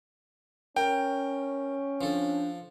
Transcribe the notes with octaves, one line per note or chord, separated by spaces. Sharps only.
C#4 A#4 G5
F3 D4 A4